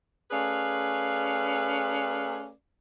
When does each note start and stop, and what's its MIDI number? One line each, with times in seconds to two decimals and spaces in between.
0.31 2.50 57
0.31 2.50 61
0.31 2.50 68
0.31 2.50 71
0.31 2.50 74
0.31 2.50 77